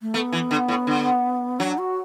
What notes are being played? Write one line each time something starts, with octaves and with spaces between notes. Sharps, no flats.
A3
A3 B3
E3
D3
A2
D3
F#3 D4
F#4